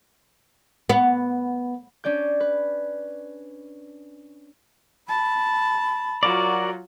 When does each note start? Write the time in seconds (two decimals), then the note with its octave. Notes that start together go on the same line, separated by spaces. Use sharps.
0.89 B3
2.04 C#4 D4 D5 G6
2.40 B4
5.08 A5 B5
6.23 F#3 F4 F#4 A#4 D5